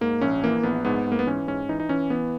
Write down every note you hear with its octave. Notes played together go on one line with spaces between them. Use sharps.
G#2 A#3
A#1 C#4
E3 A#3
A#1 B3
G#2 B3
G#2
A#3
B3
E3 C#4
G#2 C#4
E3 D#4
D#4
E3 C#4
E3 B3